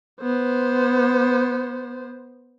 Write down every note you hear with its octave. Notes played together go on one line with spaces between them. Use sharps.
B3 C5